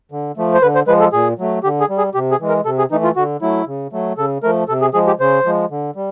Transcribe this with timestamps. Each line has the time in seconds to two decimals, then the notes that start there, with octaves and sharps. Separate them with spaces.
0.12 D3
0.37 F3 A3
0.54 C5
0.62 D3 B4
0.75 C5
0.87 F3 G#3 B4
1.00 A4
1.13 A#2 G#4
1.39 F#3 A3
1.64 D3 G4
1.81 G#4
1.89 G3
1.98 G#4
2.14 C3 G4
2.31 G#4
2.40 E3 G#3
2.48 A#4
2.65 C3 A4
2.78 G#4
2.91 E3 A3 D#4
3.04 F4
3.16 D3 F#4
3.42 F#3 A3 E4
3.67 C#3
3.93 F#3 A3
4.18 C#3 A4
4.43 F3 A3 A#4
4.69 C3 A4
4.81 G#4
4.94 F3 G#3 G#4
5.07 G4
5.20 C#3 C5
5.45 F3 G#3
5.70 D3
5.96 G3